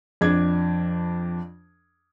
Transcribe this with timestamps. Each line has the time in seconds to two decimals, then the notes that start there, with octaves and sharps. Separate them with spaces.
0.21 F2 D4 G#6